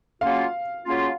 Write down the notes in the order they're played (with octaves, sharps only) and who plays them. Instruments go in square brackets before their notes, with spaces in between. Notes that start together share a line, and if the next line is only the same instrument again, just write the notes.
[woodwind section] C#3 F#3 A#3 C#4 F4 [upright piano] F5
[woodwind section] C#3 F#3 A#3 C#4 F4